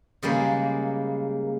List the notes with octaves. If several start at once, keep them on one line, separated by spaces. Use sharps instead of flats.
C#3 G3 G#3 A#3